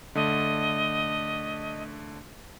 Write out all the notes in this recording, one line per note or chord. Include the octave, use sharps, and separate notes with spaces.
D3 A3 D#5